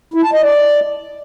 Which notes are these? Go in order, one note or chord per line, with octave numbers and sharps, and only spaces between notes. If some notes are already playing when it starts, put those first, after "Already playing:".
E4
A5
D#5
D5